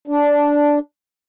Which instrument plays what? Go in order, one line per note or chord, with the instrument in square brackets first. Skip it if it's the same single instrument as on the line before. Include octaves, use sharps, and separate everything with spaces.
[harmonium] D4